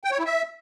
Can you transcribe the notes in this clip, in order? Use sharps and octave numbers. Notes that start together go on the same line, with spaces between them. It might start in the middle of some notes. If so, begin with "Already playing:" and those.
G5
C#5
E4
E5